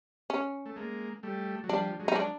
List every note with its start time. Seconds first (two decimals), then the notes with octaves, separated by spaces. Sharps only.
0.30 C#4
0.66 A3
0.76 G#3 A#3
1.23 G3 A3
1.64 F#3
1.69 F3 G3 D4
1.99 F#3 G#3
2.08 D#4
2.16 D4